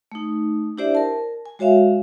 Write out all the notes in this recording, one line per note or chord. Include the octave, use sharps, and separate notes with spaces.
A3 D#4
D4 E4 G4 C5 D5 E5
A#4 A5
G#5
G#3 F#4 C#5 E5 F5